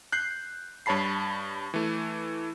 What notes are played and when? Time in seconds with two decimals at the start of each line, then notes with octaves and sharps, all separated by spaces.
0.12 F#6 G6 C7
0.86 G2 C#5 A5 B5 C7
1.74 E3 A3